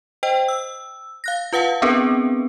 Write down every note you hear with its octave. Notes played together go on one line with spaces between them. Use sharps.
C5 D#5 G5
E6
F5 F#6 A#6
F4 B4 F5 F#5 A5
B3 C4 D4 G#4 A#4 B4